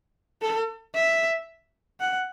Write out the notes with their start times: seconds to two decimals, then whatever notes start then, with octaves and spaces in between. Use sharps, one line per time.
0.42 A4
0.95 E5
2.00 F#5